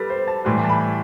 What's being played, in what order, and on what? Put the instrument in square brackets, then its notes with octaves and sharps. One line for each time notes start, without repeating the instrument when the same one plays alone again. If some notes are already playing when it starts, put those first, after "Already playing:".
Already playing: [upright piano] G3 A4 B4
C5
A5
A2 E3 G3 C6
A5
B5